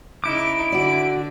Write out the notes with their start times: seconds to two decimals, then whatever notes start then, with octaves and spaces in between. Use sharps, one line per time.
0.24 C#3 D#4 E4 D6 D7
0.72 D3 F#4 D5